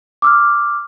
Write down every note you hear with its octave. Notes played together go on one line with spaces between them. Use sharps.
D6 E6 F6